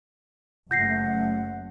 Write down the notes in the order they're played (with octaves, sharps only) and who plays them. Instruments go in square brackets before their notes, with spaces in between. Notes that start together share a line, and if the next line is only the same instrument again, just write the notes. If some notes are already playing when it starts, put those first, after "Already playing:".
[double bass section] F#1 F#2 A3 [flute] F#5 [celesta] G6 A#6 C7